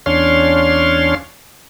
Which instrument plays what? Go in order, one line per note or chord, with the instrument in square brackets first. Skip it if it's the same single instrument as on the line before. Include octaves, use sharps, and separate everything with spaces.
[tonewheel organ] E2 C#4 D4 C#5 F5 C6